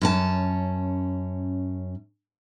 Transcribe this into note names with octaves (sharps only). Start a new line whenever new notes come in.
F#2 C#4 A5